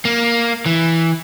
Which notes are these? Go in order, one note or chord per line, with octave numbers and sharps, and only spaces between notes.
A#3
E3